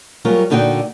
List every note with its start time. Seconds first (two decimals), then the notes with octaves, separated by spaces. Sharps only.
0.25 F#3 G3 F4 G#4 A#4 C#5
0.50 A#2 D3 D#4 F#4 C#5 G5